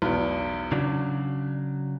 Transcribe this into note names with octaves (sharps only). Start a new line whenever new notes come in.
B1 E2
C#3 F#3 D4